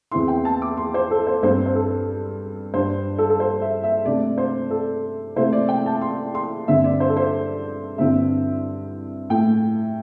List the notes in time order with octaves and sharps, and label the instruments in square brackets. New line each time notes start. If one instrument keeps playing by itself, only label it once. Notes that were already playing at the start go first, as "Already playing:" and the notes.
[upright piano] E2 E3 C4 E4 C6
G5
A5
D6
C6
C5
A4
C5
G2 G3 C4 C5
C5
A4
G2 G3 D4 C5
A4
A4
C5
E5
E5
C3 A3 D4 D5
C5
A4
C3 A3 E4 C5
D5
G5
A5
C6
C6
G2 D3 C4 E5
D5
C5
A4
C5
G2 D3 C4 E4 E5
A2 A3 E4 G5